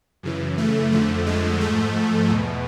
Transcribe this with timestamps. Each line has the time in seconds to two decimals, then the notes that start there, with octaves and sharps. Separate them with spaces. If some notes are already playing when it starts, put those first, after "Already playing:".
0.23 F#2 C#3 E3
0.58 A3
0.92 F2 D3 F3 A3
1.27 G#3
1.61 G#2 F3 A3
2.30 E2 B2